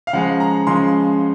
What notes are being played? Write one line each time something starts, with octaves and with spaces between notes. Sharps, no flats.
F5
C#3 F3 G#3 F#5
A#5
C#3 F3 G#3 C6